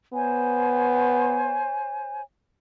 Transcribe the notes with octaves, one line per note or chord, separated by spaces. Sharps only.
B3 C5 C#5 G#5